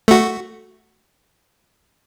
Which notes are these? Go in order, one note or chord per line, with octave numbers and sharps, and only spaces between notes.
A3 F#4